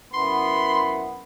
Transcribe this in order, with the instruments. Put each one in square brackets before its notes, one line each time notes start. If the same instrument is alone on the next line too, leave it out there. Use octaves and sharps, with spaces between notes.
[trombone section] F#2 B3 E4 [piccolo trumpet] B5 [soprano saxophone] C6